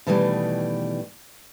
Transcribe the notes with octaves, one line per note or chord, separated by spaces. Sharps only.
B2 D#3 E3 G3 A3